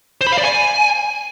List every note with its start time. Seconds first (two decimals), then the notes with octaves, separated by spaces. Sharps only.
0.21 C5
0.27 B5
0.32 F5
0.38 D5
0.44 G#5